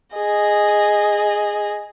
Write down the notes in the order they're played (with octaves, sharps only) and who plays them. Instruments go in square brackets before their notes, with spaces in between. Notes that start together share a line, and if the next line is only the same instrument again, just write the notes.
[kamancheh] G#4 D#5